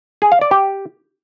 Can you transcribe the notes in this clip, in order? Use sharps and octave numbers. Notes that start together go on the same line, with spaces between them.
G#4
F5
D5
G4